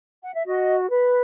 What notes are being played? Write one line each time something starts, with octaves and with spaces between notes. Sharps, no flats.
F#5
E5
F#4 D#5
B4